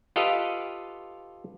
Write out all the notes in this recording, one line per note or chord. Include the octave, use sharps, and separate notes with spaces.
F4 G4 A4 B4 D#5 F5